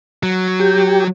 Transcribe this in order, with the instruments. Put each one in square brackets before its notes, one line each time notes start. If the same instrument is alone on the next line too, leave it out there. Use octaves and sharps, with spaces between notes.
[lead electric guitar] F#3
[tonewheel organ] G4